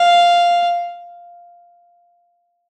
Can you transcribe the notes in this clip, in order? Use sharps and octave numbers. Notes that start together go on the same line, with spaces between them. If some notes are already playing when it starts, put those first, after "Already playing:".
Already playing: F5